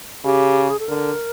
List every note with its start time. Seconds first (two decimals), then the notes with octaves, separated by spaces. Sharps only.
0.24 C#3 G4
0.70 G#4
0.80 A4
0.88 D3 A#4